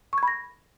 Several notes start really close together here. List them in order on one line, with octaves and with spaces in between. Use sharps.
C#6 G#6 B5 A#6